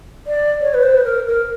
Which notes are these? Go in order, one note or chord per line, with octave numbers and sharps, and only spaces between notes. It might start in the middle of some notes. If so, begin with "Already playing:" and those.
D5
C#5
B4
C5
B4
A#4
A#4